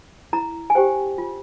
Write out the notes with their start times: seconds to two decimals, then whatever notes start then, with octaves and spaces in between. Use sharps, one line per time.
0.33 E4 A#5
0.70 G#5
0.75 G4 C5 G5
1.18 F4